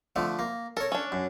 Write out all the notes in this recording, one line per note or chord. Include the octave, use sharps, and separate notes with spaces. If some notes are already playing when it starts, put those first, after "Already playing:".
D3 F3 A3
A#3
A4 A#4 C#5
C#4 D4
F#2